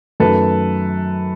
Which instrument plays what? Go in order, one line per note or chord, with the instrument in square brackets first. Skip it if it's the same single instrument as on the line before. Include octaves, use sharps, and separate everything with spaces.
[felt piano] F#2 D#3 F#3 A3 [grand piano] A4 B4